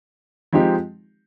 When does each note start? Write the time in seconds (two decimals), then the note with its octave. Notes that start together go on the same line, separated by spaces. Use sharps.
0.52 F3 G#3 C4 D#4 G4